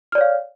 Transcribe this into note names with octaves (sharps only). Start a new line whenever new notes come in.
C#5 D5 F5 F6